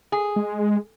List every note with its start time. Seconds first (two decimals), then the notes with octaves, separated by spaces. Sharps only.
0.12 G#4
0.36 G#3